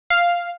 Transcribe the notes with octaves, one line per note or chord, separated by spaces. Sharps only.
F5